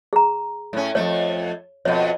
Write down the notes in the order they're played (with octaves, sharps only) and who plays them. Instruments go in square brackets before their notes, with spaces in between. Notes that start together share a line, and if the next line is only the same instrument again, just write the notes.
[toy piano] G#4 A#5
[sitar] A2 C#4
[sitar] F2 B2 A3 [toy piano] C#5
[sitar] F2 B2 [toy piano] C#5